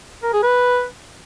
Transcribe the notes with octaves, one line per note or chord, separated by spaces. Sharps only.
A#4
G#4
B4